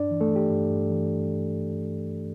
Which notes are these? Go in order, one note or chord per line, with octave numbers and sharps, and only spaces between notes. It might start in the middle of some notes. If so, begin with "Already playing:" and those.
Already playing: G2 D4 D5
E3
A3 A4
E3
G4
G2
G2
E3